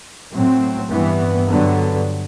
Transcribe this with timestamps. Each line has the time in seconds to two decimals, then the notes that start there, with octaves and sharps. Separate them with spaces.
0.32 A2 F#3 C4
0.90 G2 E3 B3
1.48 G2 D3 F#3 B3